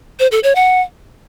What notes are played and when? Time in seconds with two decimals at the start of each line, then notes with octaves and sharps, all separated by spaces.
0.19 C5
0.31 A4
0.43 C#5
0.55 F#5